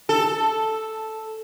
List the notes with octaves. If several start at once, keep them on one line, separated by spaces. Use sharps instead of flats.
A4